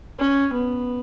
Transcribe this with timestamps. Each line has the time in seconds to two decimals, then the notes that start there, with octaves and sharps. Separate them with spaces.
0.19 C#4
0.53 B3